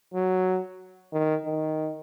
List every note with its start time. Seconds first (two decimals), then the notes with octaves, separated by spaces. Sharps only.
0.14 F#3
1.13 D#3
1.45 D#3